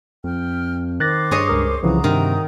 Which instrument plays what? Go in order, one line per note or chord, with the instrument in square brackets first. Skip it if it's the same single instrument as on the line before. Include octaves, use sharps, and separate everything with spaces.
[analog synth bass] F2 [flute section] G5 F6
[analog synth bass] D#3 [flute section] C5 D6 [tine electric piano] F#6 A6 A#6
[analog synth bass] G2 [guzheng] G#4 C#5 D#5
[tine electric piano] C#2 A#4 D#6
[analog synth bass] C2 [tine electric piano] C#3 E3 F3 [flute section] F#4 A#5 D#6
[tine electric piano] G2 [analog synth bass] C3 [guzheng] D#3